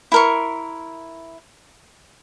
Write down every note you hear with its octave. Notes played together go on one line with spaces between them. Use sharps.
E4 A#4 C#6